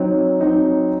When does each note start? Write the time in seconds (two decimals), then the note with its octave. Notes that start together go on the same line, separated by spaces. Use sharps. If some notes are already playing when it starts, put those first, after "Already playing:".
Already playing: F#3 C4 D#4
0.41 F#3 C4 D#4